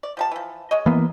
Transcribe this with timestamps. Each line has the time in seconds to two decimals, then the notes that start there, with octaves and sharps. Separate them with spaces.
0.03 D5
0.17 F3 G3 A5
0.31 E3 F3
0.71 G#3 C#5 D#5
0.86 E3 A#3 B3